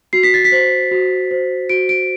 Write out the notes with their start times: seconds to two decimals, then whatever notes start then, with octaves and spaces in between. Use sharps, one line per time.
0.13 F#4 C7
0.23 B6
0.34 A6
0.45 B6
0.52 C5
0.91 F#4
1.31 C5
1.69 F#4 D7
1.89 D7